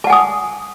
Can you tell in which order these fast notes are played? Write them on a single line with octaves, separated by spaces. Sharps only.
A5 F#5 G#5 D#6